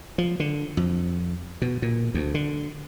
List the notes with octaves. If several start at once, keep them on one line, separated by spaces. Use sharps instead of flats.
F3
D3
F2
B2
A#2
D2
D3